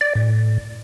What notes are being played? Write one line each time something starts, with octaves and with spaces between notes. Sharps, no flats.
D5
A2